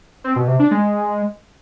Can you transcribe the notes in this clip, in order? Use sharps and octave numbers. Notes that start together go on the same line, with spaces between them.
C4
B2
C3
D4
G#3